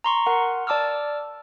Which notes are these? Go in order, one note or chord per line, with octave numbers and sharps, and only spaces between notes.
A#5 C6 C#6
A#4 F#5
D5 A5 D6 E6 F6